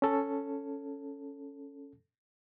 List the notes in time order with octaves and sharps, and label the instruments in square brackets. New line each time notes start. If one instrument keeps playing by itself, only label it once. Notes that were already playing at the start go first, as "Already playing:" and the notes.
[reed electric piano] C#4 A4